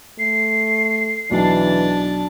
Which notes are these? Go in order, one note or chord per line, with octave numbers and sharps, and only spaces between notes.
A3 C7
B1 E3 D4 A5